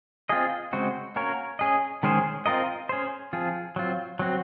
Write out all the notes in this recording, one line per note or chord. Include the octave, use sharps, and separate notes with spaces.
C4 F4 G#4 D#5
C#3 G#3 C4 F#4 C5
A#3 C#4 F#4 A#4 C#5
C#4 G#4 D#5
D#3 G#3 C#4 G#4 C5
C4 F4 A#4 D#5
C#4 G#4 C5
F3 C4 F4 G#4
F#3 C4 F4
F#3 C4 F#4